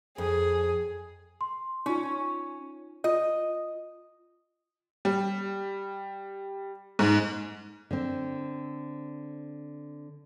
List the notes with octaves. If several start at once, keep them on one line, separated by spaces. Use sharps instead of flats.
F2 G#4
C6
C#4 D#4 F4
F4 D#5
G3
G#2
D3 C4